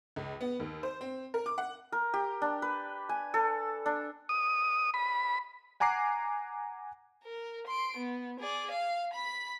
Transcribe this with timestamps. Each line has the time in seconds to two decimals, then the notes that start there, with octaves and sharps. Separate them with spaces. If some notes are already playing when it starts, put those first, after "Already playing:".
0.16 C#2
0.41 B3
0.59 D#2
0.83 C5
1.01 C4
1.34 A#4
1.46 D6
1.58 F#5
1.92 A#4
2.14 G4
2.42 D4
2.62 B4
3.09 G#5
3.34 A4
3.86 D4
4.29 D#6
4.94 B5
5.80 F#5 G#5 A#5 D6 F#6 C7
7.24 A#4
7.67 C6 D7
7.97 B3
8.39 G#4 D5
8.71 F5
9.13 B5 B6